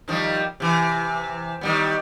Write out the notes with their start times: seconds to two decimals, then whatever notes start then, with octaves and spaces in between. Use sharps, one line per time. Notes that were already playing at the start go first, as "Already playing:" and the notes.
0.08 D#3 F3 G3
0.60 C3 E3
1.61 D#3 G3 B3